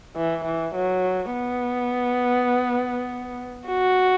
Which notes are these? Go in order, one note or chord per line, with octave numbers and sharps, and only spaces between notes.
E3
E3
F#3
B3
F#4